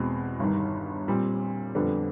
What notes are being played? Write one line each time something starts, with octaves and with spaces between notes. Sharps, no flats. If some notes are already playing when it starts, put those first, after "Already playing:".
Already playing: E2 B2 G#3 C4
G1 G2 D#3
A#2 G3 C4
F2 D3 G3 B3 D4